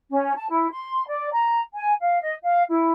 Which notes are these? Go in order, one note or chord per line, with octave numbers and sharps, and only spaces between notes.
C#4
A5
E4
C6
D5
A#5
G#5
F5
D#5
F5
E4